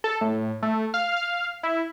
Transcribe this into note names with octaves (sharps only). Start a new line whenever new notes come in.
A4
A2
A3
F5
F5
E4